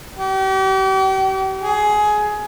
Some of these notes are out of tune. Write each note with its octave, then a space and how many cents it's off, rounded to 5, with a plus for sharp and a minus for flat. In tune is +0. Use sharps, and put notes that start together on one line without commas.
G4 -40
G#4 +15